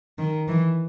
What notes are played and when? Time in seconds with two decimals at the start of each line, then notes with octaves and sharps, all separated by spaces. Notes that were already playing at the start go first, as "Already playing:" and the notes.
0.19 D#3
0.48 E3